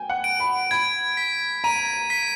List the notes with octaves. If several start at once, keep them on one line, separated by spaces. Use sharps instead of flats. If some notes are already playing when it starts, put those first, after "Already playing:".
Already playing: G5 G#5
F#5
D7
B5
B5 G#6
B6
A#5 D#7
B6